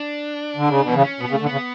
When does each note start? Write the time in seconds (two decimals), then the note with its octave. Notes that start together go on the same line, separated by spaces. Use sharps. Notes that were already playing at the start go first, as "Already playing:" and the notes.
Already playing: D4
0.57 D3
0.69 C#3
0.82 B2
0.88 E3
0.95 C#3
1.04 C#4
1.20 B2 B3
1.31 C#3 A3
1.42 D3
1.46 B3
1.52 C#3